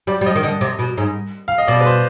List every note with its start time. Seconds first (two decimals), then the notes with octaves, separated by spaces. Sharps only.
0.07 G3 D5
0.21 G3
0.26 F3 D#5
0.36 D#3
0.43 D3 D#5
0.61 C3
0.79 B2
0.97 G#2
1.48 F5
1.58 D#5
1.67 B2 D5
1.81 B4
1.86 C5